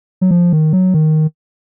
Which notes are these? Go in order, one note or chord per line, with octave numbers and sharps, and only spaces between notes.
F#3
F3
D#3
F#3
D#3